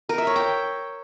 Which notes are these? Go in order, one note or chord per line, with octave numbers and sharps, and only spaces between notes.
A#4
E5
C#5
G5